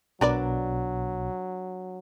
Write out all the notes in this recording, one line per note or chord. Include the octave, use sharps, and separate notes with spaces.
B1 B2 F#3 D4 A#4 B4 D5